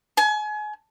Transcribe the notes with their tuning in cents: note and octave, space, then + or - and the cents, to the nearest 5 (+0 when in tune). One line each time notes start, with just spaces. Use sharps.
G#5 +30